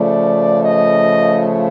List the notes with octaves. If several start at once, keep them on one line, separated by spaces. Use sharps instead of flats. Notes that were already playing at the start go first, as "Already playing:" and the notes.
Already playing: C#3 F3 A3 D5
D#5